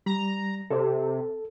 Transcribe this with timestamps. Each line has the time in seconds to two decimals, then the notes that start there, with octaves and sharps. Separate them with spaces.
0.06 G3 A#5
0.71 C3 A4